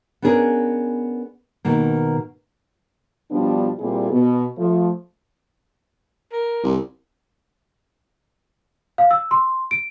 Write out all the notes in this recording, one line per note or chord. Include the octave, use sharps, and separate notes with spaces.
B3 C#4 D4 G#4 A#4
B2 D#3 A#3
B2 F3 G3 B3 D4
A#2 G3 C4 E4 G#4
B2
F3 A3
A#4
C2
F5
E6
C6
D7